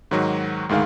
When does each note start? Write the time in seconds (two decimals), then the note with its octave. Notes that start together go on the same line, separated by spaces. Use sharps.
0.11 G#2 D#3 F#3 F#4
0.69 D2 G#2 D#3 G#3 F5